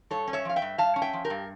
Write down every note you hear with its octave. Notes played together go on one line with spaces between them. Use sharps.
G2 A4 C#5
C#4
C#5 E5
F3 F5
E5 G5
G2
G2 F5 A5
C#4
E5 G5
F3
G4 A#4
G2